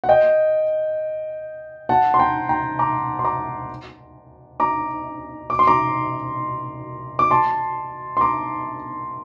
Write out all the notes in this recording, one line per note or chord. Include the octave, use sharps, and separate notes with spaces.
F#5
D#5 G5
F#5 A5
C6
G5 A#5
G5 A#5
A#5 D6
C6
A#5 D6
A#5 D6
D6
C6
A#5 D6
D6
A5 C6
C6
A#5 D6